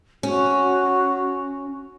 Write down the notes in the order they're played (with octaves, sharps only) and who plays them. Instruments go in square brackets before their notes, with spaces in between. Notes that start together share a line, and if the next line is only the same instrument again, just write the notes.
[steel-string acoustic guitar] C#4 [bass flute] F#4